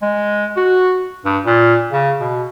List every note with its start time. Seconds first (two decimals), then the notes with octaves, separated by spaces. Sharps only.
0.02 G#3
0.57 F#4
1.25 G2
1.46 A#2
1.92 C#3
2.20 B2